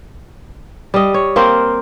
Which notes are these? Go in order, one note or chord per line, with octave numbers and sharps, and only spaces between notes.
G3 D#5
C#5
A#3 C4 A#4 C5